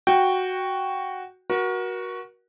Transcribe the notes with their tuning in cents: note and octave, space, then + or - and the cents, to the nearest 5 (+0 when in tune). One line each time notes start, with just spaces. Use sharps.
F#4 +0 G5 +0
F#4 +0 A#4 +35